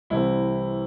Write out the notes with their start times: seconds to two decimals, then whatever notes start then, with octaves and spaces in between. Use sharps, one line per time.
0.10 C2 C3 E3 E4